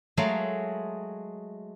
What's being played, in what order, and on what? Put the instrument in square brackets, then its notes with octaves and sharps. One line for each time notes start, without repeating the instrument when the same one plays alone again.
[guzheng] F#3 G#3 A3 G#4 A#4 F5